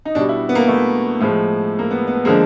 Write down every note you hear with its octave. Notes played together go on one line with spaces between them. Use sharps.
D#4
B2 G3 D4
E4
B3
A#3
A3
A2 F3 G#3
A#3
B3
B3
D3 F3 G#3 A#3